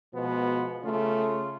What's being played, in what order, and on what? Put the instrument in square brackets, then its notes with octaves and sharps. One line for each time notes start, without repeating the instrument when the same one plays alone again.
[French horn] B2 [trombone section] F3 G#3 B3
[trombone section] C#3 F4 [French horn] A3